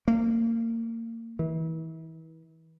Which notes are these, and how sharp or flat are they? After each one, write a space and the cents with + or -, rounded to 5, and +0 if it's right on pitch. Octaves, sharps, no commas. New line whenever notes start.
A#3 -30
E3 -35